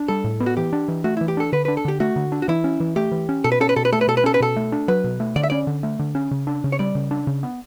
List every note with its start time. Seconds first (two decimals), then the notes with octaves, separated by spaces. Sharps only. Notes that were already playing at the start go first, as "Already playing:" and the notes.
Already playing: D4
0.08 G3 A4
0.24 A2
0.40 B3
0.46 F#4
0.57 E3 G4
0.73 D4
0.88 E3
1.04 A3 F#4
1.17 E3 E4
1.28 G4
1.37 D4 A4
1.53 D3 B4
1.65 D4 B4
1.77 A4
1.85 D3 G4
2.00 A3 F#4
2.16 D3
2.32 D4
2.42 F#4
2.48 E3 E4
2.64 C#4
2.80 E3
2.96 A3 G4
3.12 E3
3.29 C#4
3.44 B2 A4
3.52 B4
3.60 C#4 A4
3.69 B4
3.76 B2 A4
3.85 B4
3.93 A3 A4
4.01 B4
4.08 B2 A4
4.17 B4
4.24 C#4 A4
4.34 B4
4.40 B2 A4
4.56 A3
4.72 D4
4.88 F#3 B4
5.04 B2
5.20 A3
5.36 D3 D5
5.43 E5
5.50 C#4 D5
5.67 D3
5.83 A3
5.99 D3
6.15 C#4
6.31 C#3
6.47 D4
6.64 C#3
6.72 C#5
6.79 G3 D5
6.95 C#3
7.11 D4
7.27 C#3
7.43 B3